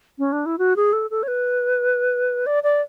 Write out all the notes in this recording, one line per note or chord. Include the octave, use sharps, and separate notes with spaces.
C#4
D4
E4
F#4
G#4
A4
A4
C#5
B4
D5
D5